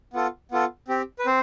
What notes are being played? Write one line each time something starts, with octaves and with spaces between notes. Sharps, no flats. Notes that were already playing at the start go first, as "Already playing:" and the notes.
B3 F4 A4
B3 F4 A4
C4 G4
B4
C4 C5